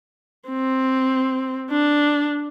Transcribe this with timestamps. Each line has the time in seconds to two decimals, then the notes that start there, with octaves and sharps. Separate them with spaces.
0.49 C4
1.71 D4